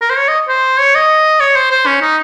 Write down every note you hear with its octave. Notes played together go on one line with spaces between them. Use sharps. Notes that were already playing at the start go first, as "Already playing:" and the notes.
A#4
C5
C#5
D#5
C5
C#5
D#5
C#5
C5
C5
C#4
D#4